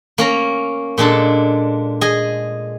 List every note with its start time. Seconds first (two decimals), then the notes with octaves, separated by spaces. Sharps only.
0.18 A#3 C#4 A#5
0.98 A#2 G#3 D4 A4
2.01 G#4 D#5 G#5